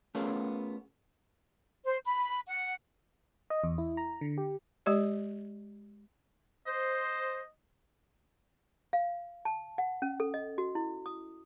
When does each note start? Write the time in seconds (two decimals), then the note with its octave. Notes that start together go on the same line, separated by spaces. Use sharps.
0.15 A3 B3 C#4 F4 G#4 A#4
1.85 C5
2.05 B5
2.48 F#5
3.50 D#5
3.64 E2
3.78 E4
3.97 A#5
4.21 D3
4.38 G4
4.86 G#3 G4 D5
6.67 C5 D#5
8.93 F5
9.45 A5
9.78 F#5
10.02 C#4
10.20 A4
10.34 D#5
10.58 F#4
10.75 E4
11.06 D#6